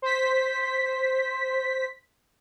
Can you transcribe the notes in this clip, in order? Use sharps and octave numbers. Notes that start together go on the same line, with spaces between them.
C5 B6